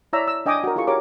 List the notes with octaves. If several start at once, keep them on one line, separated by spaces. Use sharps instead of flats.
E4 C#5 D5 E5 A#5 E6
E6
D4 D#5 G5 G#5 D6 D#6
F#4 A#4
E4 F4 G#4 A4 C#6
G4 A#4 C#5 D6